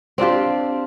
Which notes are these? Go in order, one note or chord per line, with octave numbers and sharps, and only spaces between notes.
C4 D4 F4 G4